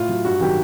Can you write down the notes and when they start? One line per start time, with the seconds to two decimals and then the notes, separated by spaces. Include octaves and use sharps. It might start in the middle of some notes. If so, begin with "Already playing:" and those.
Already playing: A2 F4
0.09 F#3
0.25 G2 F#4
0.41 D#3 F#3 G4